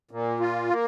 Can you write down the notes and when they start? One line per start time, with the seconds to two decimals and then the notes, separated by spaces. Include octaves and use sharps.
0.11 A#2
0.40 F4
0.70 A#3